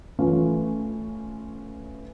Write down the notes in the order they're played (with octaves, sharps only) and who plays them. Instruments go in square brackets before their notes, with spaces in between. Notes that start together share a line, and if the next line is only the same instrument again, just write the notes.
[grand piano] E3 A3 C#4 F4